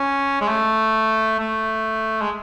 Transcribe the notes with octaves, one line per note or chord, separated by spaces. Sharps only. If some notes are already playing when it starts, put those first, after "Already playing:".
Already playing: C#4
G#3
A3
A3
G#3